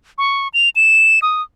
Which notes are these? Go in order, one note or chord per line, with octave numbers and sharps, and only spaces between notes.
C#6
F7
E7
D#6